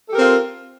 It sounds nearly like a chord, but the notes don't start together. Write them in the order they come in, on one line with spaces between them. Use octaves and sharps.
A4 G4 A#4 C4 F4